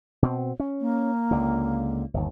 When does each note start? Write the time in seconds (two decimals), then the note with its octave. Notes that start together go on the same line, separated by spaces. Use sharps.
0.22 B2 C4
0.60 C#4
0.80 A#3
1.31 C#2 D3
2.14 G1 D#2